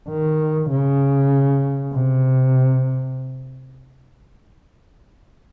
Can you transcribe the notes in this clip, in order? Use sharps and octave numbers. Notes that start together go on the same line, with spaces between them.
D#3
C#3
C3